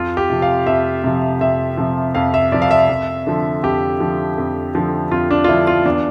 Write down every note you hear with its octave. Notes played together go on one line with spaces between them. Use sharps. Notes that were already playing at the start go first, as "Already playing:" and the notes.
Already playing: F2 F4
G4
C3 F3
F5
F2 E5
C3 F3
F2 E5
C3 F3
F2 F5
E5
C3 F3 D5
F5
E5
F2
D3 F3
F2 G4
D3 F3
F2
D3 F3
F2 F4
D4
F4
D3 F3 E4
F4
E2 D4